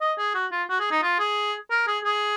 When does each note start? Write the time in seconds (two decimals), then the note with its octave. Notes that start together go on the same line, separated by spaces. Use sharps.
0.01 D#5
0.18 G#4
0.35 F#4
0.51 F4
0.69 F#4
0.80 G#4
0.91 D#4
1.03 F4
1.19 G#4
1.71 A#4
1.87 G#4
2.05 G#4